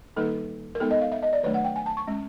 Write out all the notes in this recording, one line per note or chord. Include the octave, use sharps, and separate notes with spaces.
D#3 G3 A#3 D#4 A4
A#4
G#3 B3 D#4 A4
D#5
F5
E5
D#5
D5
D#3 F#3 A3 D4 C#5
F#5
G5
G#5
A5
C#6
G#3 C#4